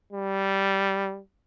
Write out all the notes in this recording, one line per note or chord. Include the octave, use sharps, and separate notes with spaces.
G3